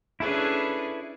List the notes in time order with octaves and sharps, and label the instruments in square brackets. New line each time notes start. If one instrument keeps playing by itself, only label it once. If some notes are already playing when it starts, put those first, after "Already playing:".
[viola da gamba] C#4 D4 G#4 [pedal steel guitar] E4 A4 B4